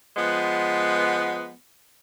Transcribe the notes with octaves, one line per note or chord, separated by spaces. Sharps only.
F3 G#3 B3